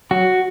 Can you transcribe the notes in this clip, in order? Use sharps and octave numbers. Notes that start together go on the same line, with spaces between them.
F#3 F#4